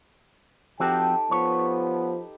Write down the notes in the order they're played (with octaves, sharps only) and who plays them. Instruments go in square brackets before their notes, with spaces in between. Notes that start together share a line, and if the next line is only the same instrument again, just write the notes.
[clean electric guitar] F3 C4 F#4 [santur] D#4 G4 A4 [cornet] G5
[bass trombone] F3 [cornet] B3 [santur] B4 [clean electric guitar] C#5